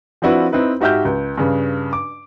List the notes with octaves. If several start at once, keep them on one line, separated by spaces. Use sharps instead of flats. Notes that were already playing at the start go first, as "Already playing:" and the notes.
F3 C4 D4 E4 F#4 B4
C4 D#4 E4 B4
G#2 F#4 G4 E5 F6 G6
C#2
G2 C#3
D6